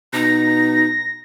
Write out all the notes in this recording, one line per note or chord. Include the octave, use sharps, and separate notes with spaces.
B2 D#4 A#6